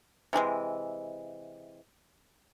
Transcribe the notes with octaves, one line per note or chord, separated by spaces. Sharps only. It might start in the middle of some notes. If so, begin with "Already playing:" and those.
C3 E3 F#3 G#3